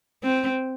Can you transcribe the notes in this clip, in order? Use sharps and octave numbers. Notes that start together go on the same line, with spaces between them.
C4